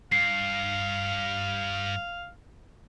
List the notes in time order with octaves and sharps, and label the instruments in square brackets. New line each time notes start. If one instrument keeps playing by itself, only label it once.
[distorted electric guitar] G2 [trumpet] F5 [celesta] C7